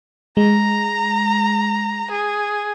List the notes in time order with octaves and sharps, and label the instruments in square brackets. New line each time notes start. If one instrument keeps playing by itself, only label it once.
[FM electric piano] G#3 [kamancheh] A#5
[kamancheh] G#4